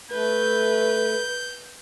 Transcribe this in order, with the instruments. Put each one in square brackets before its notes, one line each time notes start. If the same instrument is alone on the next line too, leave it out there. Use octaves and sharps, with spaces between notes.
[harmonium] A3 [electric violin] B4 [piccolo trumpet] G6